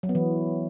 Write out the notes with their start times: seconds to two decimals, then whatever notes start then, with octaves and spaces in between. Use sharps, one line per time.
0.03 F#3
0.09 B3
0.15 E3